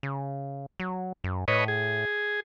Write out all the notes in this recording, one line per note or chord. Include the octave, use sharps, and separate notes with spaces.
C#3
F#3
F#2
A2 B4 C#5 D#5
G#4